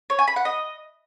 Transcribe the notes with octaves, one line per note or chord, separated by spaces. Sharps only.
C#5
G#5
B5
F#5
D#5